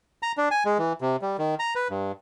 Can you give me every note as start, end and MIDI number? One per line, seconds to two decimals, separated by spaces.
0.23 0.32 82
0.37 0.49 62
0.51 0.64 80
0.65 0.78 56
0.78 0.93 52
1.01 1.16 48
1.22 1.37 55
1.38 1.55 51
1.59 1.74 82
1.75 1.88 71
1.90 2.12 43